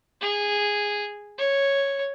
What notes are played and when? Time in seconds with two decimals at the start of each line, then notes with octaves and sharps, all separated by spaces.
0.21 G#4
1.38 C#5